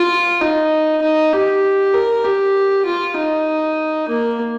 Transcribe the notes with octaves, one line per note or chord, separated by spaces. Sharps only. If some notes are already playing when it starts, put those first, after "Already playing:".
Already playing: F4
D#4
D#4
G4
A#4
G4
F4
D#4
A#3